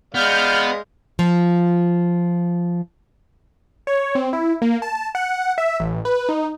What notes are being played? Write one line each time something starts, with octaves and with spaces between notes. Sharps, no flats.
G#3 B3 D5 F5 F6 G6
F3 F4
C#5
C4
E4
A#3
A5
F#5
E5
A1
B4
D#4